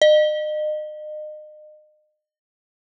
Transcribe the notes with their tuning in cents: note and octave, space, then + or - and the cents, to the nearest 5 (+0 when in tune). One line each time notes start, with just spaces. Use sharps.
D#5 -35